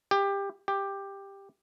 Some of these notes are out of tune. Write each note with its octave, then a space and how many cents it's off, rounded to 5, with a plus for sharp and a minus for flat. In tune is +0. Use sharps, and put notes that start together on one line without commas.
G4 +20
G4 +10